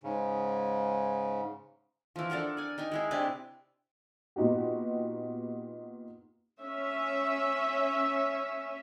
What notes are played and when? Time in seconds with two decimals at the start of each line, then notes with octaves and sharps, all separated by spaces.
0.03 G#2 C#3
2.16 E3 F3
2.30 D4 A4 A#4 F#5
2.57 D5 G#5
2.78 D#4 G5 G#5
2.92 G#3 E4 G#4
3.11 C3 D4 B4
4.36 A#2 B3 D#4 F#4 G4
6.61 C#4 E5